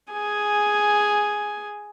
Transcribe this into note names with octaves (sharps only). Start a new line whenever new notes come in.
G#4 G#5